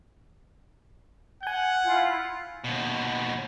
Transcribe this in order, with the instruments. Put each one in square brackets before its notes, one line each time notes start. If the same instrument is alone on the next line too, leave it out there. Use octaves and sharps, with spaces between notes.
[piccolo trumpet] F#5 [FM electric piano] G#5 G6
[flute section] E4 F4
[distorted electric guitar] D#2 B2